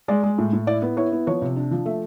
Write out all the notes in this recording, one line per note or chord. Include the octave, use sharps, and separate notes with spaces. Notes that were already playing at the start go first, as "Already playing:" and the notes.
G#3 D5
G#3
A2
A2
E4 D5
B3
E4 C#5
B3
F3 C#5
C3
D4
F3
A3 E5